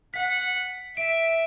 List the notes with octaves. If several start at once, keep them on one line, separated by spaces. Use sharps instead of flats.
F#5 B6
E5 D7